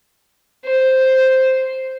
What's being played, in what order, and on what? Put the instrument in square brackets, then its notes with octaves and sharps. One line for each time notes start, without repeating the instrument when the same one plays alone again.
[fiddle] C5